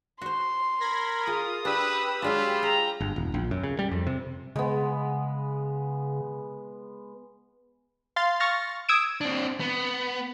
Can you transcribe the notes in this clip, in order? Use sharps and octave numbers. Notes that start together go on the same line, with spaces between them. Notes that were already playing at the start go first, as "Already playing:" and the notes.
F#4 C5 C6
A#4 B5 G#6 A#6
F4 G#4 D#6
D4 G4 B4 B5 E6
F#3 G#3 D4 F4
G#4 G5 A#5
G1
E1
A#1
F#2
C#3
G3
F2
C3
C#3 G#3 B3
F5 C6 A6
C#6 F6 A6 A#6
D#6 E6 G#6 D7 E7
C4 D4
B3